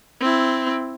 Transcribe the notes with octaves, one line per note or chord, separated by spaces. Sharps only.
C4 E4